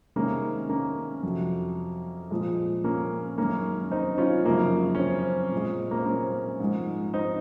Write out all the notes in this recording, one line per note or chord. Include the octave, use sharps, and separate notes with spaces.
C3 D#3 G#3 A#3 C#4
A#3 C#4
F2 C3 F#3
A#2 F3 G#3
A#3 C#4
F#2 D#3 G#3 A#3 C#4
C4 D#4
C#4 F4
F#2 C#3 F3 G#3 A#3
C#4
C4
A#2 G#3
A#3
C4
A#3 C#4
G#2 F3 G#3
C4 D#4